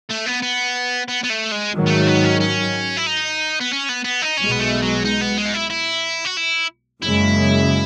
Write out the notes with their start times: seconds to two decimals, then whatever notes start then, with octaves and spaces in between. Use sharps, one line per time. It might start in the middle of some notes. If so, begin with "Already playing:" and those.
0.09 A3
0.26 B3
0.42 B3
1.08 B3
1.24 B3
1.30 A3
1.52 G#3
1.73 G#2 D#3 F#3
1.86 B3
1.90 A3
2.07 B3
2.24 C#4
2.40 C#4
2.97 E4
3.06 D#4
3.61 B3
3.73 C#4
3.89 B3
4.05 B3
4.22 D#4
4.38 B1 B2 G#3 C#4
4.52 B3
4.60 A3
4.83 F#3
5.05 D#4
5.21 B3
5.37 G#3
5.46 D#4
5.54 E4
5.70 E4
6.25 F#4
6.37 E4
7.02 F#1 F#2 C#3 G#3 E4